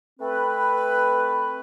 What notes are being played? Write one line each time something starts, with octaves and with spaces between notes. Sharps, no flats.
A3 C4 B4